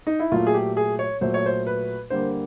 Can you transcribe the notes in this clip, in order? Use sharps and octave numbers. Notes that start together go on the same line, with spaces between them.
D#4
E4
A#2 F#3 A3 F4
G#4
G4
G#4
C#5
A#2 F#3 A3 C5
C#5
C5
B4
D3 G3 A#3 C5